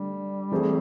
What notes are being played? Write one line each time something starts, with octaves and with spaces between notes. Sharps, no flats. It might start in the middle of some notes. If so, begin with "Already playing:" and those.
Already playing: D3 G3 A3 D4
E3 A3 C4 E4 G#4